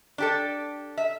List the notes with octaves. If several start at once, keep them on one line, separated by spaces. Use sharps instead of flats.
D4 G4 A4
E5